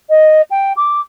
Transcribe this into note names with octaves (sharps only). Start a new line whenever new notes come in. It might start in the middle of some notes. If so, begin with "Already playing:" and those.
D#5
G5
D6